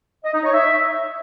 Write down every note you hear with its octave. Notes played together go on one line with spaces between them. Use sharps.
D#5
D#4
C#5
E5